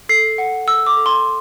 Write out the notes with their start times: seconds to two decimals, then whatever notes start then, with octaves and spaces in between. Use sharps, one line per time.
0.09 A4 C7
0.38 F#5
0.68 A4 E6
0.86 D6
0.97 A4
1.06 C6